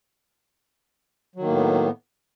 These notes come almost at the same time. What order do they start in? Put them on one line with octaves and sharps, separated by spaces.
F#3 D#3 A#3 A2 B3